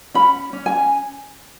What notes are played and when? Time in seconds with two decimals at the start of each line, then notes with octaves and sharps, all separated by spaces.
0.14 C#4 B5
0.53 C#4
0.66 G#5